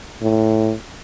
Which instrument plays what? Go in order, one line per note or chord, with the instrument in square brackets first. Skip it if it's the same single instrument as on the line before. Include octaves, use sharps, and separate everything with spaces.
[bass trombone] A2